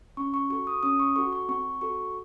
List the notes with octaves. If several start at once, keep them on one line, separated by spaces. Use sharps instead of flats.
C#4 C#6
C#6
F#4 A4 C#6
D#6
C#4 D#6
C#6
F#4 A4 C#6
C#6
C4 C#6
F#4 A4 C#6